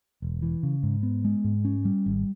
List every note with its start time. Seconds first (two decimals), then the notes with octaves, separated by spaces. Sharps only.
0.22 E1
0.42 E3
0.63 C#3
0.83 G#2
1.03 B3
1.25 G#3
1.44 G#2
1.65 C#4
1.85 G3
2.06 G#1